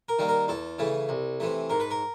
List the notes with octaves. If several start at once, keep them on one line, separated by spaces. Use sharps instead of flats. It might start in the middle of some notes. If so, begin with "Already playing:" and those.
A#4
D#3 G3 A#3
A#4
E2 A4
C#3 E3 A3
C2
C3 E3 A3
G#2 A#4
B4
A#4